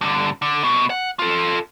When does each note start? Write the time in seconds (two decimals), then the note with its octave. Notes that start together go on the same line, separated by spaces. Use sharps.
0.01 G2 D3
0.42 D3
0.63 C2 B2
0.90 F#5
1.19 F4 A4